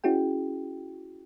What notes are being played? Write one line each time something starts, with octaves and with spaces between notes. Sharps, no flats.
C#4 E4 F#4 G#4 G5